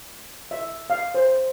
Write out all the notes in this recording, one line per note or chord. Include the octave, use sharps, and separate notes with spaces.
E5
F5
C5